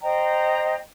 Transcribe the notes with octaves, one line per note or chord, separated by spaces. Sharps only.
C5 D#5 G5 A#5